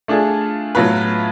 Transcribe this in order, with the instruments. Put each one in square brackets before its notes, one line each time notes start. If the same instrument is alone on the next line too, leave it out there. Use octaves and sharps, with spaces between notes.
[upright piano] A3 D4 F4 G#4
A2 F#3 B3 F4 B4